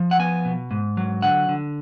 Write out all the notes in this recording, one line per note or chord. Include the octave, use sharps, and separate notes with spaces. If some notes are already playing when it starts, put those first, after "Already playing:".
Already playing: F3
F#5
B3 G#5
B2
G#2
F#3
D3 F#5
D3